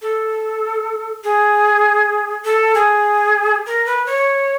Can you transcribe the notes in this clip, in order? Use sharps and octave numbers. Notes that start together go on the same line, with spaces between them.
A4
G#4
A4
G#4
A#4
B4
C#5